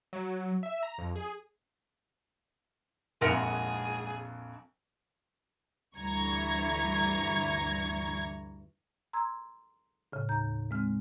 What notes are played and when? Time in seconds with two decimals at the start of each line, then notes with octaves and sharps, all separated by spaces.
0.13 F#3
0.63 E5
0.83 A#5
0.98 F2
1.16 G#4
3.21 A#1 F2 G#2 G#4 A#4 F#5
5.96 D2 G2 E3 A#5 C#6 G#6
9.13 A#5 C6 E6 G#6
10.12 A2 C#3
10.29 D#2 A#5 G6
10.71 G#3 C4 F6